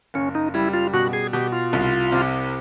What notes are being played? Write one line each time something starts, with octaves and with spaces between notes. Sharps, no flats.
F#1 C#4
D#4
G3 E4
F4
B2 F#4
G#4
B2 G4
F4
C2
C3